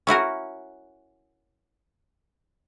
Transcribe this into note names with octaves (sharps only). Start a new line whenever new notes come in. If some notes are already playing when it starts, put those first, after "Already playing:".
C#4 E4 F#4 A#4